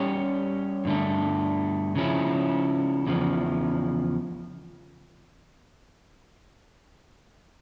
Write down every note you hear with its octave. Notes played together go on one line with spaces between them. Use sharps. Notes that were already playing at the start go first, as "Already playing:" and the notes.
Already playing: G3 C#4 G4 C#5
G2 D3 A3
C#3 F3 C#4 E4
E2 C#3 F3